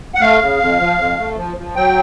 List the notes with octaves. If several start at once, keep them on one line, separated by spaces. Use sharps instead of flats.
F#5
A3 F5
C#3
F2
F3
F2
A3
F3
F3
F#3 G5